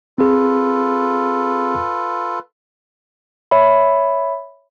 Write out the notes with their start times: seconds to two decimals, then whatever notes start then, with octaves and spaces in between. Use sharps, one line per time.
0.18 C4 F4 G#4 A4 B4
3.51 C#5 E5 B5